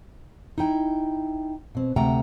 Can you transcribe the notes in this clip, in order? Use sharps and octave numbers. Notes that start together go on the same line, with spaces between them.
D#4 E4 G5
B2 C4
D2 C3 A3 F#5 G5 A#5